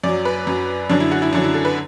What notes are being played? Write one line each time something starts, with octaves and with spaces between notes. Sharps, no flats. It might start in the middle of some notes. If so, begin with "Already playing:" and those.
F#2 F#3 D5
B4
F#2 F#3
F#2 D3 F#3 D4
E4
F#4
E4
F#2 D3 F#3 D4
E4
A4
B4